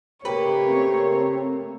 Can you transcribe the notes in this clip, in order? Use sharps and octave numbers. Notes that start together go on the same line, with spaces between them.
C#3 A3 A#3 G4 B4 C#5
C4